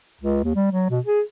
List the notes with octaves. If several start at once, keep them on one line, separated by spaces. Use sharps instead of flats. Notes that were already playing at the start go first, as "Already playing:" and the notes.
C#2
D#2
G3
F#3
B2
G#4